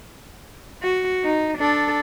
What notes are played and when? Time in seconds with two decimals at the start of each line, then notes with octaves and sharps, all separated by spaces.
0.83 F#4
1.24 D#4
1.58 D4 A4